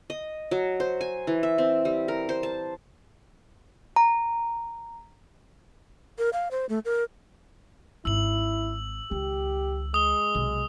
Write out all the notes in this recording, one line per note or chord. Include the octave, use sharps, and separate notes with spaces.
D#5
F#3
C5
G#5
E3
E5
C4
G3
A#4
C5
A5
A#5
A#4
F5
C5
A3
A#4
G#1 E4 E6 F#7
C#2 D#3 G4
G#3 D#6 G7
B1 C3 G7